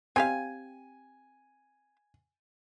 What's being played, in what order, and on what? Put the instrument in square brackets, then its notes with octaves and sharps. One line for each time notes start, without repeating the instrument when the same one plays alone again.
[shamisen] C4 G4 F5 [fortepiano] G#5